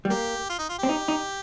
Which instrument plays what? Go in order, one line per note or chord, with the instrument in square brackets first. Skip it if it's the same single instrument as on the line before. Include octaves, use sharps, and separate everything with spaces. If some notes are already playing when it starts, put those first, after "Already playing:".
[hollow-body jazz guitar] G3
[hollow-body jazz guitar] A#3 [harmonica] G4
[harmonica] F4
D#4
F4
[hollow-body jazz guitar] C4 [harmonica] G4
[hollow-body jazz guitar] D#4
D#4